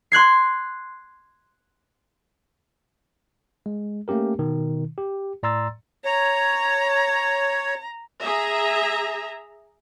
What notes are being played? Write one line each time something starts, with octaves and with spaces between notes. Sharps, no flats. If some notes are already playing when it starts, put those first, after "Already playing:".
C6 F#6 G#6 C7
G#3
A3 A#3 C#4 G4 A#4
B2 D#3
G4
A2 D5 A#5 C6 E6 A6
C#5 A#5
G#4 E5 A#5